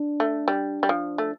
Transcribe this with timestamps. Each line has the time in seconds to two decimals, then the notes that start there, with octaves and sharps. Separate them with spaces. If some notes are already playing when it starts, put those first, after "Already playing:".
Already playing: D4
0.20 A3
0.48 G3
0.83 G3
0.89 F3
1.18 A3